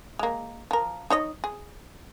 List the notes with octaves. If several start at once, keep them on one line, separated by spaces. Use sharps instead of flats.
G#3 A#3
F3 A#4
D#4 C#5 D#5
G#4